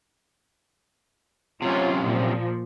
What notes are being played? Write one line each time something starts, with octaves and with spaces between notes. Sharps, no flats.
F#2 C3 C#4 F4
A#2 F3